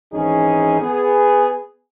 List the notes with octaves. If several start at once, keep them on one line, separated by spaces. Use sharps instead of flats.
G#1 E3 C#4 D#4 G#4
B3 G#4